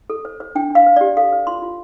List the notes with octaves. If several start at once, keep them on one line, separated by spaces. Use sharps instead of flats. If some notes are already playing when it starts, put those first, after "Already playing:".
A4
C5
C5
D4 G5
D4 F5
C5
D5
G4
A4 F5
C5
F4 C6
F4